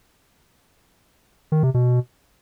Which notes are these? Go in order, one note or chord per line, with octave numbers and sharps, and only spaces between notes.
D#3
C3
B2